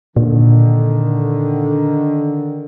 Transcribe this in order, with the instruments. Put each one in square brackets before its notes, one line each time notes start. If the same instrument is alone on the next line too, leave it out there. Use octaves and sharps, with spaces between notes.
[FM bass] A#2 [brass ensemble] D3 D#3